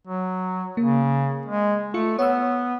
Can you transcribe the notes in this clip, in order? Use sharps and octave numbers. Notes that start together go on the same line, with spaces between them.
F#3
C#3 A#3
G#3
A3 F4 C#7
B3 C#5 E6